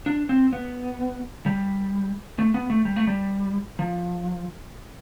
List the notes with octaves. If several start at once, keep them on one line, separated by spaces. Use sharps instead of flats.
D4
C4
B3
G3
A3
B3
A3
G3
A3
G3
F3